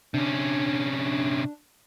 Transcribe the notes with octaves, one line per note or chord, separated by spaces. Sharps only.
C3 C#4 D4